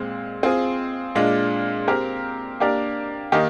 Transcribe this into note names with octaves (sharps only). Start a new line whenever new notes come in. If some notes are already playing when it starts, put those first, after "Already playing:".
Already playing: A#2 G#3 C4
C4 F4 G#4
A#2 G#3 D4 F4
C4 G4 A#4
A#3 D4 G4 A#4 D5
D#3 A#3 D#4 G4